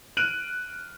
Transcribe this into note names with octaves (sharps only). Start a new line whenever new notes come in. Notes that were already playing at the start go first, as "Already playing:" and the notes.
F6 F#6 D7 D#7 F#7